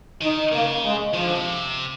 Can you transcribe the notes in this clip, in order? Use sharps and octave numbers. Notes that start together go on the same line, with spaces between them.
D#3 D#4
C#3 A#3
G#3
D#3 F3
D3
C3